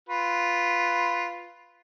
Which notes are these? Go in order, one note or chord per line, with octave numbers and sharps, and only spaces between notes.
F4 B4